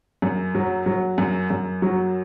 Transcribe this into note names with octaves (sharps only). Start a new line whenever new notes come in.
F#2
F#3
F#3
F#2
F#2
F#3